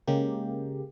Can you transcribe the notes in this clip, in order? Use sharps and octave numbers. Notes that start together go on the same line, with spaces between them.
C#3 G#3 A#3 G4